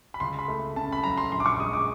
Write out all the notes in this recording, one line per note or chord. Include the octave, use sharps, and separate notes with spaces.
B5
C#2 C6
B5
A3
C#3 A5
B5
F#3 A#5
C6
A#1 C6
D6
C#6
G#3 D#6
D6